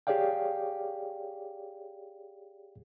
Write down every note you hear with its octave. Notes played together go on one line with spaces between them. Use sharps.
G4 G#4 C#5 D5 F5 G5